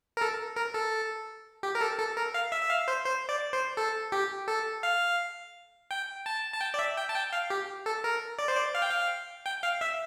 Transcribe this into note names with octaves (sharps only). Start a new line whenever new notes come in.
A#4
A4
A#4
A4
G4
A#4
A4
A4
A#4
F5
E5
E5
F5
C5
C5
D5
C5
A4
G4
A4
F5
G5
A5
A5
G5
D5
E5
G5
A5
G5
F5
G4
A4
A#4
D5
C5
D5
F5
G5
F5
G5
F5
E5